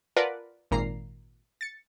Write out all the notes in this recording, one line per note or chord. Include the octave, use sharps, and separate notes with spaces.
F4 A#4 B4 D5 F#5 A5
G#1 A#2 A#5 C7
A6 C#7